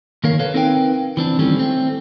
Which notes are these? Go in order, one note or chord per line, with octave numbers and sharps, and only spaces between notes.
D#3 A#3 A#4 C#5 F5
A4 B4 C#5 F5
C4 D#4 A#4 B4 F5 G5
E3 C4 D4
D#3 E3 G3 A3 C4 C#4
A3 C4